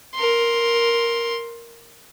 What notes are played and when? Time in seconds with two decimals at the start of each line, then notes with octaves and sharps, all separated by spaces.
0.15 A#4 C6